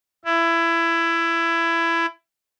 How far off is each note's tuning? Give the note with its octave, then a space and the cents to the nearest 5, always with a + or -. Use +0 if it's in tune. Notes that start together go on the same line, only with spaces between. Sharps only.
E4 +20